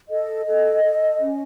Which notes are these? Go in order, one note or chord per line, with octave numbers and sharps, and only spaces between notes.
A4 D#5
A4
A4
C#4